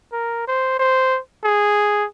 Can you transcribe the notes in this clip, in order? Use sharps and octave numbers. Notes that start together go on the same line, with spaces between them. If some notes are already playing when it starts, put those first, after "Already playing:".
A#4
C5
C5
G#4